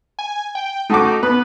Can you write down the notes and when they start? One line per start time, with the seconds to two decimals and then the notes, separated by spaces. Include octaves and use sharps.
0.19 G#5
0.55 G5
0.90 A3 D#4 F#4 D6
1.23 B3 B4